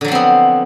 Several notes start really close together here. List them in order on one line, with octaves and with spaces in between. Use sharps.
D3 F#3 F3 C4 B3